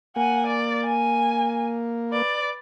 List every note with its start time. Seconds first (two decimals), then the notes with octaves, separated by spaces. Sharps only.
0.16 A#3 F#5 G#5
0.47 D5
0.85 G#5
2.11 B4 D5